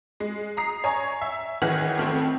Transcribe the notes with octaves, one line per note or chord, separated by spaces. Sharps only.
G#3
A#5 D#6 C7
C#5 G#5 A#5
E5
B1 D#3 E3 G#4 F#5
F2 D#3 A3 C4